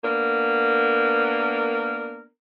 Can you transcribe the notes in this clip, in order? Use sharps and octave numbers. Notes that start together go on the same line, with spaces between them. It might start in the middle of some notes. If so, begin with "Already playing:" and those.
A#3 B3 D4 A#4